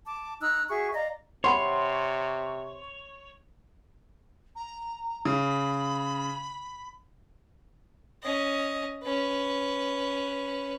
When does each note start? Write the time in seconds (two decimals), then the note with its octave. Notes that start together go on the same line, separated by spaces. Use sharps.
0.07 A5 D6
0.41 D#4 A#5 E6 F#6
0.69 F#4 G#4 E5 C#6
0.93 D5 D#5 F5 A#5
1.44 C3 C5 C#5 F#5 B5 C6
4.56 A#5
5.25 C#3 B5
8.23 C#4 D#5
9.03 C#4 B4